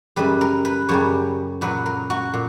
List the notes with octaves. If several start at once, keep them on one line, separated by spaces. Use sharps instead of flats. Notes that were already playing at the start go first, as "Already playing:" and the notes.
F#2 C#3 G3 B4
A#4
B4
F#2 C#3 G3 C#5
A#2 F#3 B4
A#4
F#4
A#2